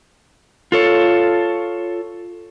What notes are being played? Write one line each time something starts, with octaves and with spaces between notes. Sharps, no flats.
F4 A4 C#5